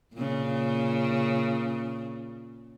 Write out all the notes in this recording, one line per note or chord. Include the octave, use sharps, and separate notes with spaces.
A#2 C#3